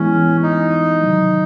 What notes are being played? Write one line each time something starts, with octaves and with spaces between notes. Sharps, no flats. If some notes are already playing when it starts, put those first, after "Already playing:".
Already playing: E3 G#3 B3 C#4 E4
D#4
C3 D#3 F#3